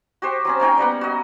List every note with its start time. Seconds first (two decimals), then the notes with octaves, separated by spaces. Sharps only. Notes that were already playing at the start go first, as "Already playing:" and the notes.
0.22 F#4 G4 C5
0.45 F#3 C4 C#4
0.60 A#3 C#4 D#4 G5
0.77 G3 A#3 B3 F#5
1.01 F#4 D#5